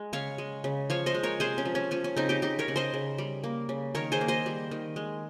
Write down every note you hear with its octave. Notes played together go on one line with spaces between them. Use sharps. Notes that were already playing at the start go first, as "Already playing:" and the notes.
Already playing: G#3
C#3 C#5 F5
G#3
C#3
F3 C#5 F5
C5 D#5
G#3
A#4 C#5
C3 G#4 C5
C#4
F3
C#4
F3 C#4
C#4
C#3 C4 D#4
D#4 G4
C#3 D#4 G4
A#4 C#5
C#3
C5 D#5
C#3
G3
A#3
C#3
D#3 A#4 C#5
G#4 C5
A#3
C5 D#5
G3
D#3
G#3